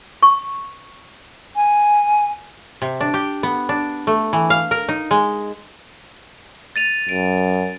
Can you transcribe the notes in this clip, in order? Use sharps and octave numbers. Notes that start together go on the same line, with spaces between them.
C#6
G#5
C3
D4
G4
B3
D4
A3
E3
F5
A#4
D#4
G#3
A6 D#7 F7
F#2 D7